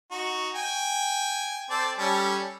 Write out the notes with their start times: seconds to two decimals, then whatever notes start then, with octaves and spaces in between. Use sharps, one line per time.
0.11 D#4 F#4
0.55 G5 G#5
1.70 C4 A4 D5
1.98 G3 C#4 A4